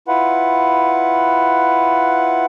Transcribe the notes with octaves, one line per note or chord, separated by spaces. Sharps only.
E4 F4 B4 F#5